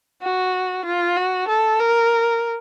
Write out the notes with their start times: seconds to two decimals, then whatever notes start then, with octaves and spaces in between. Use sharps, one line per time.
0.23 F#4
0.86 F4
1.17 F#4
1.48 A4
1.80 A#4